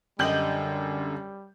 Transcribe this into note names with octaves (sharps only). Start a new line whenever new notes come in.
F#2 D3 G3 G4 D#5 G6 F#7